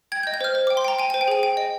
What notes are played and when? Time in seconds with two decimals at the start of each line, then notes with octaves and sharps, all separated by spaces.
0.12 G5 G#6
0.23 G6
0.27 D#5
0.34 G6
0.41 C5 F6
0.55 C5
0.67 G5 D6
0.77 C6
0.85 G5 A#5
0.99 G5 G#5
1.10 C5 G#5
1.21 G5
1.28 G#4 G#5
1.43 G5
1.57 D#5